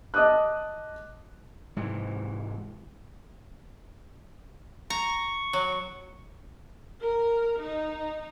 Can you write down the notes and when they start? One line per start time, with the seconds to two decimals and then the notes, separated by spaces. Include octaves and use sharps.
0.14 D#5 A5 D6 D#6 F#6
1.76 G#2 C3 E3
4.90 A#5 C#6
5.53 F#3
7.00 A#4
7.60 D#4